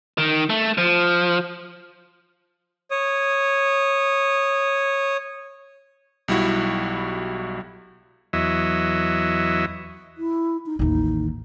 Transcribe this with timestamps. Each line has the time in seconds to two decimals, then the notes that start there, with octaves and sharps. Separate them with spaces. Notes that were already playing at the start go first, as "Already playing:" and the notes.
0.18 D#3
0.50 A3
0.78 F3
2.91 C#5 D#6
6.28 B1 G3 E4 F#4
8.33 E2 F#3 D#5 E5
10.18 E4
10.66 D#4
10.79 A1 D#2 D#4